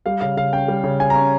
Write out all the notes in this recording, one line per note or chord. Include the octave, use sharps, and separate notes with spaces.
G3 F5
C#3 F5
C#3 F5
C#4 G5
G3
C#3
C#3 G#5
A#5
C#4